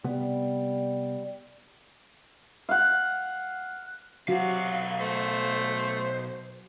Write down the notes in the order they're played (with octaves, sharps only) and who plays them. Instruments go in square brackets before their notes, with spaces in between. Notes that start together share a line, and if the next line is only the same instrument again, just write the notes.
[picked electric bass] C3 B3 [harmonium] G3
[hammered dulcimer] F5 F#5
[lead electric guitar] B1 F5 [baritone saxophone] C3 [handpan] F#3 F#4
[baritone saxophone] A3 [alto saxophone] C5